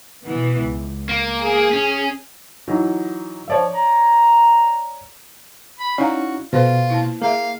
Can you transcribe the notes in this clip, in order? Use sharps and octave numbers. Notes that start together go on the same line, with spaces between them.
B2 E3 B3
C#2
A#3
G#4
C#4
E3 F#3 D#4
F3 C#5 D5 E5
A#5
B5
C#4 D#4 E4 F#4 D5 F5 A#5
B2 F4 A4 B4 C5
A#3 E4
A#3 G#4 E5 F5